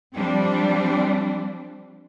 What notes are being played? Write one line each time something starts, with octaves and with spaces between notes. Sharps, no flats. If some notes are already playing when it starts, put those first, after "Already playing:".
F3 G3 C4 D4